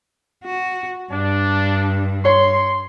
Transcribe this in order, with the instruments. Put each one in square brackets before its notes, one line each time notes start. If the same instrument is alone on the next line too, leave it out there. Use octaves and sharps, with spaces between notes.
[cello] F#4
[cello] G2 [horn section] D4
[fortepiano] C#5 [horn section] C6